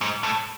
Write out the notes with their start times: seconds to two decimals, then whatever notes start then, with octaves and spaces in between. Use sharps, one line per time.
0.01 G#2
0.23 A2